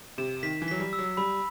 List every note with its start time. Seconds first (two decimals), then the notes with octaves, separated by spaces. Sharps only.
0.18 C3 E7
0.42 D#3 B6
0.62 E3
0.68 F#3 B6
0.80 G3
0.93 E6
0.99 F#3
1.17 G3 B5